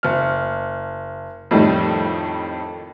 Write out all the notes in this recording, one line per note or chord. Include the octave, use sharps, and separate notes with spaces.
F#1 F6
F2 A2 D#3 G3